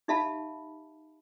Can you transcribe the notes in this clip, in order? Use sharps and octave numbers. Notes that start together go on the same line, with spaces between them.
D#4 G4 E5 F5 A5 B5